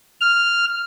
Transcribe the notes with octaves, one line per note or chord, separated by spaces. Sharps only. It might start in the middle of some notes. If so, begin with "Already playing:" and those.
F6